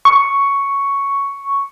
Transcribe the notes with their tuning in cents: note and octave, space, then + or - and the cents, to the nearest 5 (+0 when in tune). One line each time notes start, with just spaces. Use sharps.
C#6 +5